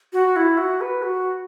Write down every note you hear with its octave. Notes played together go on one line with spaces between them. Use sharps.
F#4
E4
F#4
B4
F#4